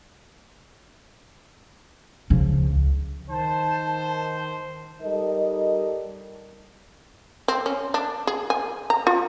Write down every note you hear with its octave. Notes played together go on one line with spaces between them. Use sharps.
C#2 C#3 F3
D#3 C5 A5
G3 D#4 A4 A#4 D#5
C4
C#4
D4
G#4
G#5
A#5
F4